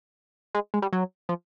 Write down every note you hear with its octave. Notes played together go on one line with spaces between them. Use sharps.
G#3
G#3
G3
F#3
F3